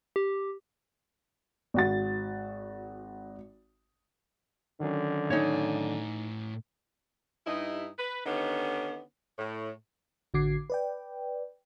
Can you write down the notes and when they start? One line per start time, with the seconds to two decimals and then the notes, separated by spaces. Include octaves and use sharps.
0.16 G4
1.74 G#1 F#4 A6
4.81 D3 D#3 F#3 C#4
5.30 A2 D#4 C#5 G#5
7.47 G2 D#4 E4
7.99 B4
8.26 D3 D#3 B3 C#4 D#4 G4
9.39 A2
10.34 A1 D3 F#4 D6 G#6 C7
10.70 B4 D5 G5